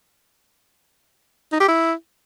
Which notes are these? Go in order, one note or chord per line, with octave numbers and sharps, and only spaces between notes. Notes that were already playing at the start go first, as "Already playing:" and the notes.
D#4
G4
E4